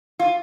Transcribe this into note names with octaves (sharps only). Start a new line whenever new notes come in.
F4